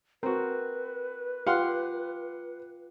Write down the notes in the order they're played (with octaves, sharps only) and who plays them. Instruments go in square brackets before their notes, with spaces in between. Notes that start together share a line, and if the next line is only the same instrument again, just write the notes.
[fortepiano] C4 F#4 [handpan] A#4 [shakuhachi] B4
[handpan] F4 G4 [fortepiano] F5 F#5 C6